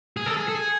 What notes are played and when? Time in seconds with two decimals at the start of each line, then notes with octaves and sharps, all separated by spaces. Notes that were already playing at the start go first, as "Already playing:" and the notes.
0.17 G#4
0.26 A4
0.37 G#4
0.48 A4
0.55 G#4